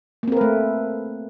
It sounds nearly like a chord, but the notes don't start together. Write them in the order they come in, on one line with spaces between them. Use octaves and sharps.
A#3 C4 A#4 B4 A3